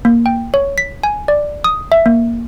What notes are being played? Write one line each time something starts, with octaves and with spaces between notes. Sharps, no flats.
A#3
G5
C#5
B6
G#5
D5
D#6
E5
A#3